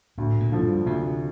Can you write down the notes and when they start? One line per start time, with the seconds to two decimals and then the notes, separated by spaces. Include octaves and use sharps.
0.18 D2 A2
0.40 A#2
0.52 D3 F3
0.63 G2
0.86 D2 C3